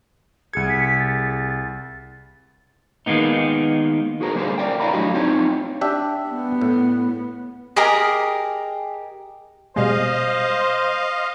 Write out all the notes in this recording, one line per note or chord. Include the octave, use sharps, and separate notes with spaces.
C2 G#4 G#6 C#7
B6
A6
D#3 G#3 A#3 B3 D#4
F#4 G#4 A#4 C5
D3 G3 A#3 G#4 C5
A#4 D5 G5
E4 C#5 D5 F5 A#5 B5
F#3 A3 D4 F#4 G4 D#5
C4 D#4 F4 C#5 G5
D4 G4 E5
B3
A2
G4 G#4 A#4 D#5 A#5
B2 G3 G#3 C5 D#5 F5